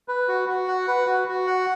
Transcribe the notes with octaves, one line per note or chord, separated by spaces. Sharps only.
B4
F#4
F#4
F#5
B4
F#4
F#4
F#5